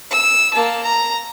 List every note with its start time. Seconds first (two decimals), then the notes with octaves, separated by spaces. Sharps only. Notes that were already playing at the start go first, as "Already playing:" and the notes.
0.11 E6
0.54 A#3 A5
0.83 A#5